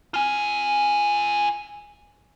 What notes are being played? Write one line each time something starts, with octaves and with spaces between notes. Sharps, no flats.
F4 G#5